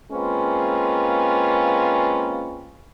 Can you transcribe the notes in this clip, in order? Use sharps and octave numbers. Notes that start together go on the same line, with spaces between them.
G#3 A#3 C4 C#4 F4 B4